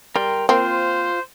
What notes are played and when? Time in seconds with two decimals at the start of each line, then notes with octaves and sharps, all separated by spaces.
0.16 G3 A#4 G5 C6
0.49 A#3 C4 F4 C5